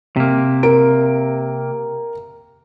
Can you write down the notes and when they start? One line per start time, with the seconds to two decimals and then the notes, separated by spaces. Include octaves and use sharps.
0.16 C3 A#3
0.63 A#4 D7